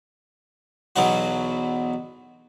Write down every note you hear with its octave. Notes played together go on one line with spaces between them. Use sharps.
B1 E2 B2 F#3 F#4